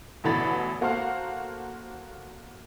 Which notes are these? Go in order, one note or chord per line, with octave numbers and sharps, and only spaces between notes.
A1 B2 D3 E3 B5 A6
A#3 F#4 A4 C5 F5